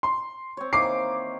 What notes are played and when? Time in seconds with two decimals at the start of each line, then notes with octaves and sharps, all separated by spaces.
0.03 C6
0.57 C4 C#5
0.73 D#3 E3 A#3 D6 C7